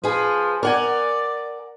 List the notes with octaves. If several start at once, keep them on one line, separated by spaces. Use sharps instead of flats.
F3 G#4 B4
A#4 D5 F#5 G#5